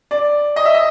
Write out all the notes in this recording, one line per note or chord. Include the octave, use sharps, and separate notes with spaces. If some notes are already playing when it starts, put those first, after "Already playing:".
D5
D#5
E5
D#5